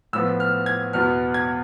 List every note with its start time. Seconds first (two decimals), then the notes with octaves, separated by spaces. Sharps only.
0.13 A2 F3 B3 E6
0.40 F6
0.66 G#6
0.93 E2 B2 B3 F6
1.34 G#6